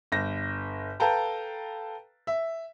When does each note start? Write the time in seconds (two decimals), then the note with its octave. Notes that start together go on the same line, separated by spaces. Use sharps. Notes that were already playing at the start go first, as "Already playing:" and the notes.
0.12 G1 A#6
1.00 A4 B4 F5 G5 A5 A#5
2.27 E5